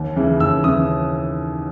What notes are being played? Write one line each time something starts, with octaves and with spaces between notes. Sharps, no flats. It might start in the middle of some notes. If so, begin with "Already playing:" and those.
Already playing: D#2
C#3 E3
D#2 E6
C#3 E3 D#6